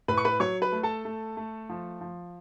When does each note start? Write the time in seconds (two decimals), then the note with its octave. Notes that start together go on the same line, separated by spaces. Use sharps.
0.08 A2 B4 B5
0.18 C#6
0.25 B4 B5
0.40 F#3 C#5 C#6
0.62 B4 B5
0.72 A3
0.83 A4 A5
1.05 A3
1.37 A3
1.69 F3
2.01 F3